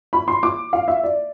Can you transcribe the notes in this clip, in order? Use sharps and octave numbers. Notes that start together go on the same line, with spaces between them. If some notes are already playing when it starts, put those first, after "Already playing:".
B5
C6
D6
F5
E5
D5